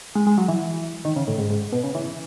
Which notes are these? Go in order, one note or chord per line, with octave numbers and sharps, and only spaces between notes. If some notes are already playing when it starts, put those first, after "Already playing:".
G#3
G#3
F#3
E3
D#3
C#3
A2
G#2
G#2
B2
C#3
E3